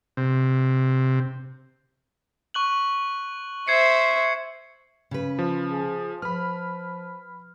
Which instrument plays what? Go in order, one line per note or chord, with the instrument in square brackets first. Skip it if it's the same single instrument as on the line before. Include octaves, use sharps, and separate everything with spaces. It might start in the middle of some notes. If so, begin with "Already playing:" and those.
[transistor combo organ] C3
[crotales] C#6 F#6 F#7
[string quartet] C5 E5 [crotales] G#6 C7 C#7
[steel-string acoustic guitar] C#3 B4
[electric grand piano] F3
[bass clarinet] G#4
[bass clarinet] F3 [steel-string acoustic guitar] B4 [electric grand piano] B5 F6